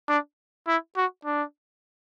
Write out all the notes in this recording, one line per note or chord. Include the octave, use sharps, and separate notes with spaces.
D4
E4
F#4
D4